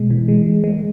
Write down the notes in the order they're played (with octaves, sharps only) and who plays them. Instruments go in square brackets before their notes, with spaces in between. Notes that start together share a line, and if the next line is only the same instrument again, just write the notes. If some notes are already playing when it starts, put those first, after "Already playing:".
Already playing: [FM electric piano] B2 G#3
E3
G#3
G#3
G#3